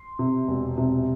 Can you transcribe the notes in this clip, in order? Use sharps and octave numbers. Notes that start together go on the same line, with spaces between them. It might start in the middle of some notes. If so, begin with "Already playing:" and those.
Already playing: C6
C3
E1
C3